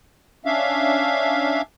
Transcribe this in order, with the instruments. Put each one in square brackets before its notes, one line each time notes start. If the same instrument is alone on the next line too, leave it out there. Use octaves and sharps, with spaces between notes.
[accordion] C#4 D4 E5 F5